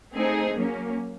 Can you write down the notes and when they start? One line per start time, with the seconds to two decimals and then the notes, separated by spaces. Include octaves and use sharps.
0.13 A3 C4 D#4 G#4
0.54 F#3 A#3 C#4